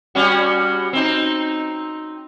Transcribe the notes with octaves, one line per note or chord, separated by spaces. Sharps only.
G3 C#4 F#4
C4 D#4